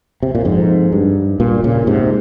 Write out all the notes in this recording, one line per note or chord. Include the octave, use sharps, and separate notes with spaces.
C3
A#2
F2 G#2
G2
G2 A#2
A#2 C#3
G#2 C3